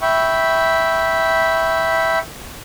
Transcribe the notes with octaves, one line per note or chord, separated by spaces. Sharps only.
E5 G5 B5 C#6